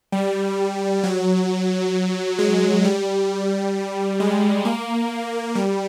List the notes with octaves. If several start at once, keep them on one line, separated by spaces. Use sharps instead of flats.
G3
F#3
G#3
G3
G#3
A#3
G3